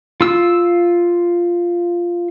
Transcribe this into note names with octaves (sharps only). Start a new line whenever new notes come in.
F4 E6